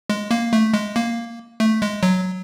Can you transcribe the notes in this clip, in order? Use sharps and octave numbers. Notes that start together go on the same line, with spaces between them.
G#3
A#3
A3
G#3
A#3
A3
G#3
F#3